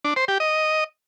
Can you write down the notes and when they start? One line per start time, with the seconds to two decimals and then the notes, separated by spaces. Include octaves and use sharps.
0.05 D4
0.16 C5
0.28 G4
0.40 D#5